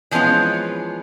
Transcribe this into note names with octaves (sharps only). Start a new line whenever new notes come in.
E3 F3 G#3 B3 C#4 F4